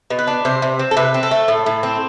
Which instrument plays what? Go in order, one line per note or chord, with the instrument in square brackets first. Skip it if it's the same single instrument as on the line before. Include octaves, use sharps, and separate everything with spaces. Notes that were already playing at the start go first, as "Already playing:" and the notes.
[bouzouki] B2
B4
D4
C3 C5
C3
C4
A4
C3 B4
C4
A4
A3
A2
A2
C4